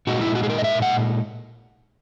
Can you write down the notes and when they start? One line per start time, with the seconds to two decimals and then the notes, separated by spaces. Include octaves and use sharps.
0.07 A#2 G#3 D#4 F#4
0.21 E4
0.35 F#4
0.43 G#4
0.50 A#4
0.58 D#5
0.64 E5
0.82 F#5